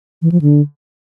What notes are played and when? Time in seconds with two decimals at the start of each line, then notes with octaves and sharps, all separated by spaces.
0.22 E3
0.32 F3
0.42 D3